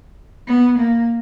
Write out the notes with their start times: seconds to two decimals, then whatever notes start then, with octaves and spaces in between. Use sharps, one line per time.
0.47 B3
0.78 A#3